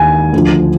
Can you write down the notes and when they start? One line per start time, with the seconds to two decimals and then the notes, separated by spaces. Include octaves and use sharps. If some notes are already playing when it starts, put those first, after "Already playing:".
Already playing: D#2 D#3 G#5
0.33 D2 D3 F3